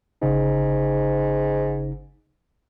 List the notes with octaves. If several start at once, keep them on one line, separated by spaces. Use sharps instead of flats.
G1 G#2 C#3 D#4